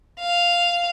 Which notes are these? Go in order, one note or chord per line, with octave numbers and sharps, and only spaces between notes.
F5